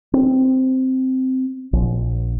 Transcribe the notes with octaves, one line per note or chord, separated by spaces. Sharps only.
C4
A#1